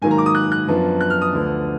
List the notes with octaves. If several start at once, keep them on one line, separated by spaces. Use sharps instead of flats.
G#2 D#3 F#3 A#3 G#5
A#5
D6
D#6
F#6
F#6
F#2 F3 B3 D4
F#6
F6
D#6
D2 D3 F3 B3 D4